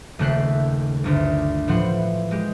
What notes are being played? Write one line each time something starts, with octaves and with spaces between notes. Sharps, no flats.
D#1 C#3 A3 G5 F#6 C7
G1 D2 G2
A2 E3 F3 F#5 C6
G#3 G4